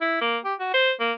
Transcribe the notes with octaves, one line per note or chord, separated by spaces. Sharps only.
E4
A#3
G4
F#4
C5
A#3